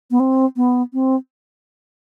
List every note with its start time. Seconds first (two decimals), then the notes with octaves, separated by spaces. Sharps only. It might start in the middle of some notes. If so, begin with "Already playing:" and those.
0.11 B3
0.20 C4
0.56 B3
0.93 C4